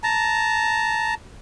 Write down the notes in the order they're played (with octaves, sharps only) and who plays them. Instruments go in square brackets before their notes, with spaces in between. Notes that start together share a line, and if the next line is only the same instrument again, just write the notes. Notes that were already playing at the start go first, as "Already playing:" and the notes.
[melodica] A5 A#5